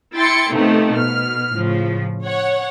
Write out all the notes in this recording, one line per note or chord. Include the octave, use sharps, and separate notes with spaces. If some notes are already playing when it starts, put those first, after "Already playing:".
E4 G5 C6 A6 C#7
C3 D#3 F3 A3 B3 C4
B2 F6
A2 C#3 F3
C#5 F#5